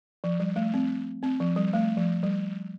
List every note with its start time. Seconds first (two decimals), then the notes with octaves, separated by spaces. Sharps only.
0.24 F3
0.40 G3
0.56 A3
0.74 C4
1.23 C4
1.40 F3
1.56 G3
1.73 A3
1.97 F3
2.23 G3